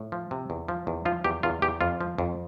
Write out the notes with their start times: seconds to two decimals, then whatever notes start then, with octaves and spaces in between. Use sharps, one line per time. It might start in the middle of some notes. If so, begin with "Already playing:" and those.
Already playing: A2
0.12 F3
0.31 C3
0.50 E2
0.68 F3
0.87 E2
1.05 F3 F4
1.24 E2 G4
1.43 E2 F4
1.62 E2 G4
1.81 F2 F4
2.01 F3
2.18 F2